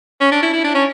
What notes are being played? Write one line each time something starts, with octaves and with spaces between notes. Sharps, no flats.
C#4
D4
E4
E4
D4
C#4